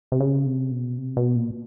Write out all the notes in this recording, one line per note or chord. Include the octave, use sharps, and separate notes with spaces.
C3
C#3
C3
B2
C3
B2
A#2